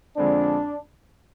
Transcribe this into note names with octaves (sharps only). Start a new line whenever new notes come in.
F2 D3 G#3 C4 D4